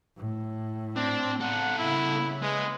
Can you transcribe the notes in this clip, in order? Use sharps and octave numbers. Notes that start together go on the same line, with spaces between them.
A2
C4 D4
B3 A4 F#5
C#3 E4
G#3 B3